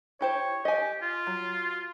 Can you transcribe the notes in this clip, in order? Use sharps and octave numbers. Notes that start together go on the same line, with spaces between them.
E4 G4 C5 C#5
G4 D#5 G#5
F4
F#3